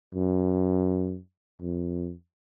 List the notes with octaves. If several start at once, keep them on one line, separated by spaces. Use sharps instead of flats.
F#2
F2